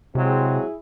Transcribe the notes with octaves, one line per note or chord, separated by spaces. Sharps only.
C3 F#3 G#3 C4 E4 G#4